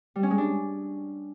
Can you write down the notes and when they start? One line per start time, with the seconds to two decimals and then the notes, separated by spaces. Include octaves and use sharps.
0.16 G3
0.23 C#4
0.31 G#3
0.38 D4